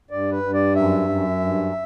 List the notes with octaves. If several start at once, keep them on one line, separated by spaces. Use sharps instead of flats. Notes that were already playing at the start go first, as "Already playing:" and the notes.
G2 D5
B4
G2
D5
F#2 E5
F#2
G2